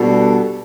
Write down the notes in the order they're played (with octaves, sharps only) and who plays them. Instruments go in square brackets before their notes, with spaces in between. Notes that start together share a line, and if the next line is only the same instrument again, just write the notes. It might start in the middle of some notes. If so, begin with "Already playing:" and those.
Already playing: [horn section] B2 G3 D4 A4 [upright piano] F#4